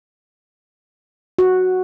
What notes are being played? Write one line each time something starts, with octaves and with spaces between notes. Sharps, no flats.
F#4